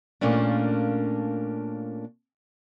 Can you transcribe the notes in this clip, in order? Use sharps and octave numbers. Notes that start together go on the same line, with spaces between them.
A#2 A3 A#3 C#4 D4